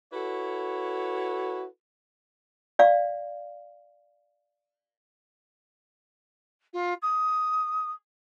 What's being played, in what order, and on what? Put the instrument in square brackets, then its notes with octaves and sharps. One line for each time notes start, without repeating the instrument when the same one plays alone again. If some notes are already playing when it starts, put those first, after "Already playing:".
[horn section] E4 F#4 A4 B4 C#5
[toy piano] D5 F5
[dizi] F4
D#6